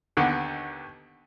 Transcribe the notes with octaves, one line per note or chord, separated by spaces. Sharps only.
D#2 D3 B3